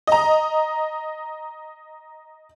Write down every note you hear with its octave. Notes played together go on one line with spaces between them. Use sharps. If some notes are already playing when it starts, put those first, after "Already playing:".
D#5 A#5